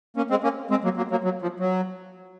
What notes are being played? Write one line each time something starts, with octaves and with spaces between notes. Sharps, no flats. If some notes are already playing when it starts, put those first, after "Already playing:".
A#3 C#4
G#3 C4
A#3 C#4
G#3 C4
F#3 A#3
F#3 A#3
F#3 A#3
F#3
F3
F#3